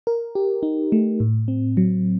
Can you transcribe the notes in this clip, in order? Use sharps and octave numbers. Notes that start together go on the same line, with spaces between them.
A#4
G4
D#4
A3
A2
C4
F#3